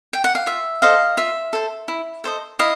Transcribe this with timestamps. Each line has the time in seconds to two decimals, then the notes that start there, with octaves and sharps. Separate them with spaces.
0.13 G5
0.24 F#5
0.35 F5
0.46 F4 E5
0.82 A4 C5 D#5 F5
1.17 F4 E5
1.53 A4 C5
1.88 E4
2.24 A4 C5 D#5
2.59 E4 D#5 F5